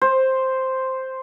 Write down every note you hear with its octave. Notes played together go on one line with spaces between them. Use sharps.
C5